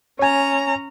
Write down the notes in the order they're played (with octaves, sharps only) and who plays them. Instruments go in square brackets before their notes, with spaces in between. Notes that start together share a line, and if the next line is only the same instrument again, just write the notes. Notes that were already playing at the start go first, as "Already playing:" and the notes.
[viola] C#4 A#5 [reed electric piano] C#5 G#5